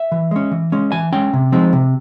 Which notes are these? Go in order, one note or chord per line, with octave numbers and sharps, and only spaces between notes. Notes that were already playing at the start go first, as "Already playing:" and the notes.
Already playing: E5
E3
G#3 C#4
E3
G#3 C#4
E3 G#5
G#3 C#4 G5
C3
F3 G#3 C4 D#4
C3